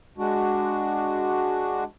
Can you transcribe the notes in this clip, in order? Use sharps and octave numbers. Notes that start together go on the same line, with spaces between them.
G#3 D4 F#4